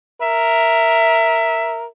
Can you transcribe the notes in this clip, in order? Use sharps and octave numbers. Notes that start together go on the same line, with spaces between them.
A#4 E5